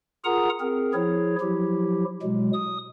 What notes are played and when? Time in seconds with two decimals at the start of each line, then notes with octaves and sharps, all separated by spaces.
0.25 F4 G#4 A#4 F#5 A#5 D#6
0.60 C4 G#4 A#4
0.94 F3 E4 G#4 C#5
1.41 F3 F#3 E4 G4
2.23 B2 F#3 G#3
2.53 D#6